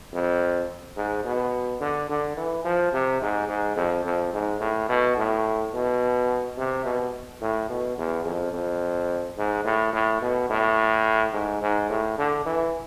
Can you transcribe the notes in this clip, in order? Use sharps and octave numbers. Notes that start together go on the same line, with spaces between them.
F2
G#2
B2
D3
D3
E3
F3
C3
G#2
G#2
F2
F2
G#2
A2
B2
A2
B2
C3
B2
A2
B2
E2
F2
F2
G#2
A2
A2
B2
A2
G#2
G#2
A2
D3
E3